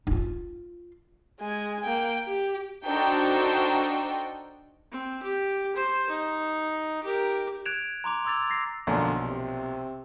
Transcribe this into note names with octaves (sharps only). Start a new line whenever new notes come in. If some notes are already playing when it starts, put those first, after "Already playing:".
D#4 F4
G#3 G#5
A#3 G5
G4
D4 D#4 F#4 A4 C5 G5
C4
G4
C5
D#4
G4 A#4
F#6 G#6 D7 E7 F7
A#5 C6 D6 F7
C6 D6 E6 G#6 A6 F7
A6 A#6 C7
B1 A#2 D3 F3
C3